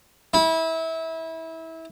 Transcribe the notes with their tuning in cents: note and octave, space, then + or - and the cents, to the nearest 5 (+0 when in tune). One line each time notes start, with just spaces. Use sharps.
E4 -25